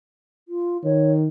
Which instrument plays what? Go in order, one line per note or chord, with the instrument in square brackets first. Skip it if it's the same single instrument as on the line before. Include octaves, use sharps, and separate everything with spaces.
[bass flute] F4
[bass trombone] D#3 [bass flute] C#5